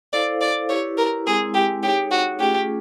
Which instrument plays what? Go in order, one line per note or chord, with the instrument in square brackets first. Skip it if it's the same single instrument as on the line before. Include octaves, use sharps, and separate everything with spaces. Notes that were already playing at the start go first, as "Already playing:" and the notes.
[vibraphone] E4 A4 C5 F5 [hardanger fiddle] D5
[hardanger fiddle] D5
[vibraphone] E4 G4 B4 [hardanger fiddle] C#5
[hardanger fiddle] A#4
[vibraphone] G#3 C4 E4 [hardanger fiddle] G#4
[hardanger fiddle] G4
[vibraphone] D#4 G#4 C#5 [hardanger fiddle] G4
[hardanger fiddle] F#4
[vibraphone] A3 C#4 F4 G#4 [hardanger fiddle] G4